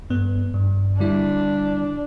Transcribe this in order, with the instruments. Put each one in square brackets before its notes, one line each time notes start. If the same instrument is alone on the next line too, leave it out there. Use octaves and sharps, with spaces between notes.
[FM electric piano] G2 B3
G2
[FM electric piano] D3 G3 E4 [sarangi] D4